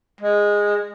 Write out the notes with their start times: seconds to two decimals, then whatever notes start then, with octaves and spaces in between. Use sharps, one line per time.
0.21 G#3